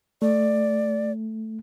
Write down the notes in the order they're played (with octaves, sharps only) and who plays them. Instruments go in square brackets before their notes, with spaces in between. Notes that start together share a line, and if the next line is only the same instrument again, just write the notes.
[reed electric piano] A3 [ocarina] D5